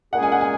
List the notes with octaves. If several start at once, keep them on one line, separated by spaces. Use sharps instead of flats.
A#2 G#3 C#4 G#4 F#5
G#5
F#5
G#5